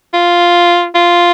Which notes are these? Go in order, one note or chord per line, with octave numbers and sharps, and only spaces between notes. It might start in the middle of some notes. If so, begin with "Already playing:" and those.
F4
F4